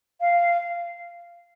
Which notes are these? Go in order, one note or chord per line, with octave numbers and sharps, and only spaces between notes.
F5